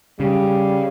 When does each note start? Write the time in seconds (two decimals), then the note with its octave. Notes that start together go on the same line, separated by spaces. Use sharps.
0.20 C#3 G3